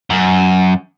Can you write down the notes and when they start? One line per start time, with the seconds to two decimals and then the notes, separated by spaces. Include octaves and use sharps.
0.10 F#2